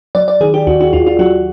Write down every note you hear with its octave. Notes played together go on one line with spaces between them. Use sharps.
F#3 D5
D5
D#3 G#4
G4
D#2 F#4
F#4
D#2 F4
F4
F#3 F#4